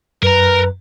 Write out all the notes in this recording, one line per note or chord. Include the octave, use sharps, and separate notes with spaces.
F#2 A#4 B4 A#5